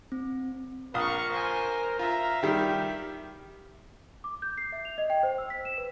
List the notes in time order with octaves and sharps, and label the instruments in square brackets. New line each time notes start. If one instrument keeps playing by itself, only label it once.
[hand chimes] C4
[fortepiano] A#1 D#6 [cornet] A#4 [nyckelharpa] F5 C#6
[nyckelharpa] C5 G#5
[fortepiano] F4 [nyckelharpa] E5 F5 [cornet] A#5
[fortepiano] D#3 G3 [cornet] G4
[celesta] D6
G6
C7
E5
F7
D#5
G5
C5
E6
B6
E7
B4